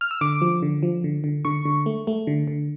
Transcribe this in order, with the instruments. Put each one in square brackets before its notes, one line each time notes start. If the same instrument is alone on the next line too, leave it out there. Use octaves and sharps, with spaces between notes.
[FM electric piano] F6
E6
D3 D6
F3
D3
F3
D3
D3
D3 C#6
D3
A3
A3
D3
D3